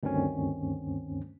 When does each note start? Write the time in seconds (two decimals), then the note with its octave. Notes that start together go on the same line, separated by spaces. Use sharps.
0.03 D2 G2 D#3 C4 C#4